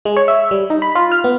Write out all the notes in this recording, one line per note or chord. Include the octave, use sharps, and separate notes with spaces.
G#3
C#5
E5
G3
D#4
B5
F4
F6
B3